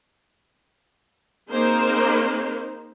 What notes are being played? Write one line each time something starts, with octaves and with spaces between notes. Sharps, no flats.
A#3 C4 D#4 G#4 A#4 C5